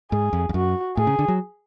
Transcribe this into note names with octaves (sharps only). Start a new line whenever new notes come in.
G#2 G#4
F2
F2
F#2 F#4
A2 G#4
C#3
D3
F#3